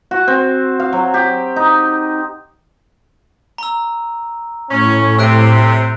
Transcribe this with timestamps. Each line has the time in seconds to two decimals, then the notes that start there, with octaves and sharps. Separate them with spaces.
0.11 F#4
0.28 C4
0.80 F5
0.93 F#3
1.14 G4
1.56 D#4
3.58 A#5 E6
4.70 A2 C#4
5.18 C3 E6 F#6 D7